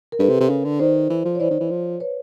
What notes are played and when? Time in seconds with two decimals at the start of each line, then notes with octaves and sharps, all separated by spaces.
0.12 A#4
0.19 G2 A4 B4
0.29 C3
0.40 C3
0.49 C#3
0.65 D3
0.80 D#3 C5 D5
1.10 E3
1.25 F3
1.35 C#5
1.40 E3 C5 D5
1.51 D#3
1.60 E3
1.70 F3
2.00 B4 C#5